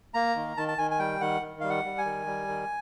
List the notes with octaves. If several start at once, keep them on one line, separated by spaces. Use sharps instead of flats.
A#3 A#5
D#3
D#3 A5
A5
D#3 G#5
G#5
G3 G5
D#3 F#5
D#3
G3 F5
F#5
G3
G#5
D#3
G3
D#3